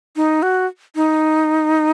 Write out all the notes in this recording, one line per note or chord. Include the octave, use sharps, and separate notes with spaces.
D#4
F#4
D#4